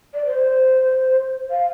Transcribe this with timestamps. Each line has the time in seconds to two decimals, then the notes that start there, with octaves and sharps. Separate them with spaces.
0.14 D5
0.26 C5
1.51 F5